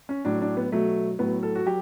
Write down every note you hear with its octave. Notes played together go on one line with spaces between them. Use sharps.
C#4
A2 F#3 D4
D4
B3
B2 F#3 A3
A2 F#3 B3
A4
F#4
F#3 G4